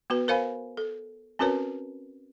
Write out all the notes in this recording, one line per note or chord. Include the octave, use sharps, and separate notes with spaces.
B3 F#4 B4
A#4 C5 F5 G#5 B5
A4
C4 C#4 F#4 A#4 B4 C#5